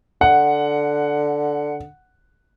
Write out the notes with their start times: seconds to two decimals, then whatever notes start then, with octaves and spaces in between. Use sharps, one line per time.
0.21 D3 F#5